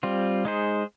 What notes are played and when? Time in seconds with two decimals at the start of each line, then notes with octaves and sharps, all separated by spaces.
0.03 G3 C4 F4
0.45 G#3 D#4 G#4 C5